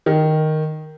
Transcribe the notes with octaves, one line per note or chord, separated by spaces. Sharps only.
D#3